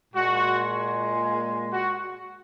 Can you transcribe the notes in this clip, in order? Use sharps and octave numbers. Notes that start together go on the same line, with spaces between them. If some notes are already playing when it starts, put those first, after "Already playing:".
A#2 G#3 F#4
F#4